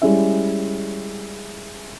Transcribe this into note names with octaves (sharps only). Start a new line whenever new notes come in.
G3 G#3 C#4 E4 E5